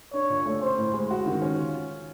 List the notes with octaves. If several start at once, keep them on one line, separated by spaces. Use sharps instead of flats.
D4 C#5
A#2
A3
C#4 C5
A2
G#3
F#4
D#3
C#4
F4